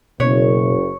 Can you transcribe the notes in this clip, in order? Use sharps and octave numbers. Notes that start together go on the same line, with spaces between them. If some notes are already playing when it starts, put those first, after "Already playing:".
F#1 B2 C#5